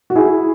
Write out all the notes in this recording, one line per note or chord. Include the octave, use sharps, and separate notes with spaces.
F#4
E4 G#4